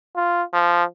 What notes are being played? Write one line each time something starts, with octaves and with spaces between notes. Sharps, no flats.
F4
F3